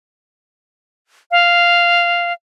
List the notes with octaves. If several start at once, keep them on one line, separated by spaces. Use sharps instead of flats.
F5